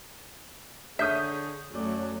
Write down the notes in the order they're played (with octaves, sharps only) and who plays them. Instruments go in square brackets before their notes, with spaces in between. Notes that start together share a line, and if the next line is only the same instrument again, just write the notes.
[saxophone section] D3 C#5 [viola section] G#4 [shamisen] E5 [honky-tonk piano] D#6 G6 B6
[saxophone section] F#2 F#4 D5 [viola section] F#3 A3